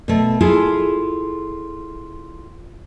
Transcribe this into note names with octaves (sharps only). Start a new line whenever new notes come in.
B2 A3
E4 F4 G#4 A4